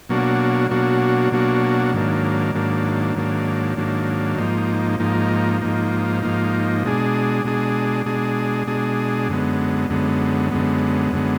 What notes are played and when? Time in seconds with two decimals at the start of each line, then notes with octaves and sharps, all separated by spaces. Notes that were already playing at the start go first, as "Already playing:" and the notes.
0.09 B2 F#3 A#3 D4 F#4
0.71 B2 F#3 A#3 D4 F#4
1.32 B2 F#3 A#3 D4 F#4
1.93 G#2 D#3 F#3 A#3 D4
2.55 G#2 D#3 F#3 A#3 D4
3.16 G#2 D#3 F#3 A#3 D4
3.77 G#2 D#3 F#3 A#3 D4
4.38 G#2 F3 A#3 D#4
5.00 G#2 F3 A#3 D#4
5.61 G#2 F3 A#3 D#4
6.22 G#2 F3 A#3 D#4
6.84 B2 G#3 D4 G#4
7.45 B2 G#3 D4 G#4
8.06 B2 G#3 D4 G#4
8.67 B2 G#3 D4 G#4
9.29 F#2 D3 G#3 B3
9.90 F#2 D3 G#3 B3
10.51 F#2 D3 G#3 B3
11.12 F#2 D3 G#3 B3